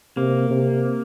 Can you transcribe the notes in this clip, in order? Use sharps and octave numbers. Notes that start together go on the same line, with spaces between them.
C3 A#3
C3